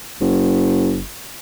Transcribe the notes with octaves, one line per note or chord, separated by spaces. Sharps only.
F#1